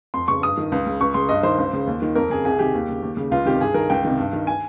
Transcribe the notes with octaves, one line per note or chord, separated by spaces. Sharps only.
F2 C6
C#3 C#6
G2 D#6
D#3
C#2
C#3
C#2 C#6
C#3 C6
G2 D#5
D#3 C5
C#2
C#3
D#2
D#3
F2 A#4
C#3 G#4
C2 G#4
C3 D#3 G4
D#2
C#3
D#2
C#3
C#2 F4
C3 D#3 G4
G2 G#4
D#3 A#4
C#2 G5
C3 D#3
G2
D#3
G#5